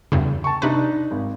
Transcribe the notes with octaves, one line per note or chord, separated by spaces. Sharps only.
E2 G2 C#3
A5 C#6
C3 D4 D#4 B4
G#1